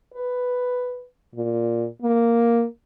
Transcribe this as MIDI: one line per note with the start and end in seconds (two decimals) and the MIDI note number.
0.14 1.03 71
1.35 1.86 46
2.02 2.65 58